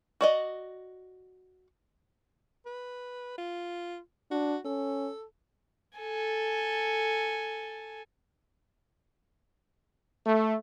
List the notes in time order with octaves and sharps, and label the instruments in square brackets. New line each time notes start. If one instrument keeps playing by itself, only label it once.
[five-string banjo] F#4 D5 D#5
[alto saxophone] B4
F4
[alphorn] D4 [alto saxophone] F#4
[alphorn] C#4 [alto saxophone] A4
[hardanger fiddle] A4 G#5
[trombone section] A3